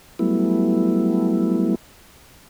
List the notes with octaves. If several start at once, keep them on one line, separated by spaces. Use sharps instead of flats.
F#3 G3 A3 B3 E4